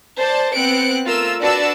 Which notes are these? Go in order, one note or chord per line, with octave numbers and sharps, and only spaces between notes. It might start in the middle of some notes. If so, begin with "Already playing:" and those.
C5 D5 A5
B3 C4 F#6 C#7 D7
A3 F4 A#4 E6
D4 F#4 B4 D5 A5 E6